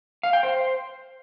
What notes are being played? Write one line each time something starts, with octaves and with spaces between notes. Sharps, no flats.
F5
G5
C5